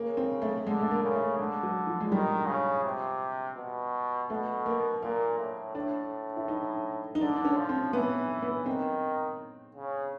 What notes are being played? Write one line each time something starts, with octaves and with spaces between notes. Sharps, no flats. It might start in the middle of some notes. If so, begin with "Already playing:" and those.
Already playing: C#3 A#3
C4
A3
D3 G#3
A3
A#3
C#3
A3
D3 G#3
F#3
F3
G#3
D#3 G3
C#3
C3
B2
B2 A3
A#3
A#2 A#3
A2
A2 D4
E4
D#4
D#4
D3 D4
D4
C#4
F3
C4
E3 B3
B3
D#3 C4
C#3